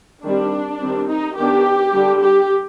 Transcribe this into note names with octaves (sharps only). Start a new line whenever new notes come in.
D#3 G3 C4 D4
D#3 G3 C4
D#4
D#3 B3 D4 G4
D3 G3 D4
G4